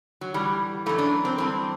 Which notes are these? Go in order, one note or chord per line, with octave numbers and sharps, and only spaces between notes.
F#3
A2 E3 G3
F#2 E3 A3
D4
C4
G2 E3 C4